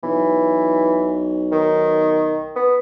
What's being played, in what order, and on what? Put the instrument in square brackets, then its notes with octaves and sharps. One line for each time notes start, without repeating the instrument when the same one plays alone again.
[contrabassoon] B1 [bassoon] E3
[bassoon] D#3
B3